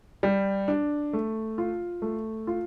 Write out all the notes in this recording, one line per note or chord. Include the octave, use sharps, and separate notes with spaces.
G3
D4
A3
F4
A3
F4